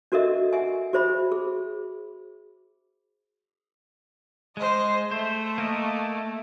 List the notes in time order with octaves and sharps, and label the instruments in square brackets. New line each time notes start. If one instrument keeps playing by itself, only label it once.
[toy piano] D4 F#4 A4 A#4 D#5 E5
E5 F#5 G#5
F#4 G#4 C5 E5 B5
G#4
[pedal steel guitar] G#3 [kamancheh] C5 D#5
[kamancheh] A3 [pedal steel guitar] C5
[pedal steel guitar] A#3 A#4 D#5